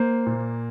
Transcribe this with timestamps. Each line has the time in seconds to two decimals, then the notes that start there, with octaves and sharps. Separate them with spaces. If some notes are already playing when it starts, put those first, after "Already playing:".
Already playing: A#3 C5
0.26 A#2